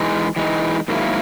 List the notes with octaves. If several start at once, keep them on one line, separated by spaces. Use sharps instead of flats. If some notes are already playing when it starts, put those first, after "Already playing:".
Already playing: E3 G#3 D#4
E3 G#3 D#4
G#2 D#3 F#3 A#3 E4